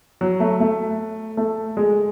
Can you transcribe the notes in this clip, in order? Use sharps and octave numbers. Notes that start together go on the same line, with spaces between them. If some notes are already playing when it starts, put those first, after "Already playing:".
F#3
A3
A3
A3
G#3